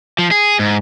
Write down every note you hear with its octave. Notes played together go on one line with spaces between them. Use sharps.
F3
G#4
G#2